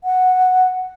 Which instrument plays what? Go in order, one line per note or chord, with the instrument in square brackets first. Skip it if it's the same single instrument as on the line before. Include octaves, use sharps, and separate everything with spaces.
[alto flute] F#5